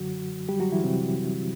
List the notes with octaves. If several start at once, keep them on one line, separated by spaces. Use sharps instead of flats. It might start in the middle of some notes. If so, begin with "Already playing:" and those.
Already playing: F#2 D3 F#3 F#4
G3 G4
F#3 F#4
E3 E4
C3 C4